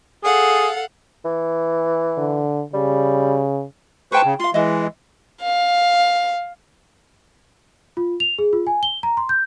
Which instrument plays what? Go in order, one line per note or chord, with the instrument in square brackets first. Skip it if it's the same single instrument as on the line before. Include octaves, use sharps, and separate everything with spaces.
[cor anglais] G#4 [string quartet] A4 F5 F#5
[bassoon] E3
[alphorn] D3
[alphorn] C#3 [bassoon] G3
[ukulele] G#4 G5 A5 [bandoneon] B4 C5 C#6
[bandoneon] C#3
[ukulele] F4 F5 [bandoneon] C6
[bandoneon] E3 G#3 [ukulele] D#5 E5
[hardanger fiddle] F5
[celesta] F4
F7
G#4
F4
G#5
G7
A#5
C6
G6